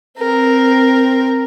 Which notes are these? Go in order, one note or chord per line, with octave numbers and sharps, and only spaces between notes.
C4 A#4